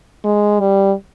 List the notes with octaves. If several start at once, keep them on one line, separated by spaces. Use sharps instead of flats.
G#3
G3